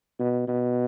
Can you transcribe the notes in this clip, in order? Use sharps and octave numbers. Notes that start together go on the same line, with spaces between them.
B2
B2